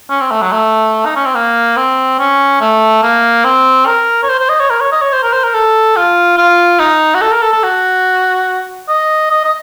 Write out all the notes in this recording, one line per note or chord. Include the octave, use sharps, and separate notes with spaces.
C#4
C4
A3
F#3
A3
D#4
C#4
C4
A#3
C4
C#4
A3
A#3
C4
A#4
C#5
C5
C5
D#5
C#5
A#4
C#5
D#5
C#5
C5
A#4
C5
A#4
A4
F4
F4
D#4
F#4
A4
A#4
A4
A4
F#4
D#5
D#5
D#5